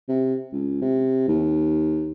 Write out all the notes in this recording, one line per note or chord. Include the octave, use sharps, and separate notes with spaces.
C3
C#2
C3
D#2